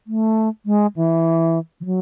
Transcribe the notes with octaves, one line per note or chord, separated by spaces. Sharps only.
A3
G#3
E3
E3
F#3